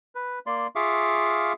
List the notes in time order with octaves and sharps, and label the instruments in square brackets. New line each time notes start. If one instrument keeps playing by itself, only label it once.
[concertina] B4
A#3 D5 C6
F4 G#4 E5 F5 C#6 D6